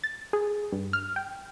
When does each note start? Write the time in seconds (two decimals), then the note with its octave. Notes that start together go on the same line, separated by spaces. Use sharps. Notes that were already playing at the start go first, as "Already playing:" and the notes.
0.04 A6
0.33 G#4
0.72 G2
0.93 F6
1.16 G5